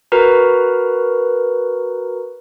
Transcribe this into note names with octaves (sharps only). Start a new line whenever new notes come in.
F#4 A#4 B4 A#5